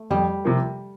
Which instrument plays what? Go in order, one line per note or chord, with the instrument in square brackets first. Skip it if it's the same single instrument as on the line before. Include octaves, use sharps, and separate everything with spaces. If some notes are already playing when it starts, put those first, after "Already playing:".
Already playing: [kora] A3
[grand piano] F2 [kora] G3
[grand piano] C3 F3 A#3